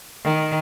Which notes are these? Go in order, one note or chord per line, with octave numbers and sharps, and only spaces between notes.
D#3